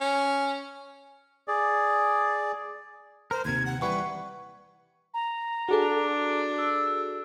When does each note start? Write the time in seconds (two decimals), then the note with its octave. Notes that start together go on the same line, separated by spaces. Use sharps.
0.01 C#4
1.48 G#4 D5
3.31 A#4 C5
3.45 D#2 C3 G#6
3.66 F#5
3.81 E3 G3 B4 F#5 C#6
5.14 A#5
5.69 D4 F#4 G#4 A4
6.58 E6